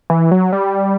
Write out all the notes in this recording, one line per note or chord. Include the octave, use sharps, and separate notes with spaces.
E3
F#3
G3